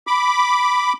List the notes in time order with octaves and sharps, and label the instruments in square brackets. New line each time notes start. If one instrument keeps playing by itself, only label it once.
[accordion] B5 D6